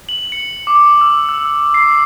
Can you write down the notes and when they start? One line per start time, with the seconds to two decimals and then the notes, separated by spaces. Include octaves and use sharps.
0.09 F#7
0.32 C#7
0.67 D6
1.01 E6
1.29 E6
1.74 C7